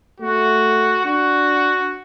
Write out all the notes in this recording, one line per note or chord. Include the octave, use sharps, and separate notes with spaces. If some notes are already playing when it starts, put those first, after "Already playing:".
A3 F#4
D4 F#4